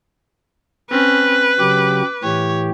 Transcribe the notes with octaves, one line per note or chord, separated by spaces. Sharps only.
C4 C#4 B4
C#3 F#3 G4 D6
A2 E3 G4 C#5